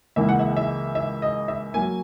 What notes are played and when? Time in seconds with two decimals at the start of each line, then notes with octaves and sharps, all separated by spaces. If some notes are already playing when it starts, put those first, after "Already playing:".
0.16 C#2 C#3 E3 A#3 E5
0.29 F#5
0.39 E5
0.57 E5
0.95 E5
1.22 D#5
1.48 E5
1.74 F#3 A#3 G#5